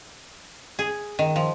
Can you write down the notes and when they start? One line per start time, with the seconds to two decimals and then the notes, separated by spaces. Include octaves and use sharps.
0.79 G#4
1.19 D#3
1.36 F3